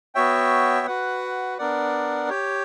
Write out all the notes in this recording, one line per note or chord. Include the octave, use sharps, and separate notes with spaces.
B3 F#4 C#5 E5 G5
F#4 B4 F#5
B3 D4 A#4 D5 F#5
G4 C#5 G5